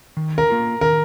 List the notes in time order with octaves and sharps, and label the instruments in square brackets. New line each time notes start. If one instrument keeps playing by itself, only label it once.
[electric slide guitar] D#3
[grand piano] A#4
[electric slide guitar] A#3 F4 A#4
[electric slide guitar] D#3 [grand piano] A#4